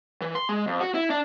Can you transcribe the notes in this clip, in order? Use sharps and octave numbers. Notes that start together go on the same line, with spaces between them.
E3
C6
G#3
F2
F#4
E4
D4